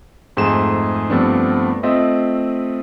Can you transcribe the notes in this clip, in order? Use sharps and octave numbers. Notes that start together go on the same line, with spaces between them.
F2 G#2 A3 G#4 E7
G2 F3 A3 B3 C4 D4
A3 C4 F4 D#5 E5